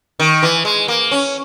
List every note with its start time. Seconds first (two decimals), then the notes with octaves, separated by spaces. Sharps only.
0.20 D#3
0.43 E3
0.65 G#3
0.88 A#3
1.11 C#4